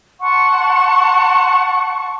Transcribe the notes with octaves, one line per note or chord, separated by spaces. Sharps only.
F#5 A5 C6 C#6